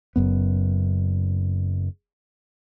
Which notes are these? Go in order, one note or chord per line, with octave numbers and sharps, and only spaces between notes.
F#1 F#2 B3